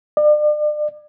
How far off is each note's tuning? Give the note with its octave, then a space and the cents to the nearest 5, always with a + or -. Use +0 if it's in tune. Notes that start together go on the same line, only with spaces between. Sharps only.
D5 +35